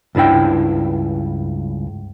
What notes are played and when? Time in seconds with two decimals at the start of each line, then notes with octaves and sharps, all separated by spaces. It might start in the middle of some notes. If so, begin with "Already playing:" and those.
0.15 C#2 G2 D4 E4 G5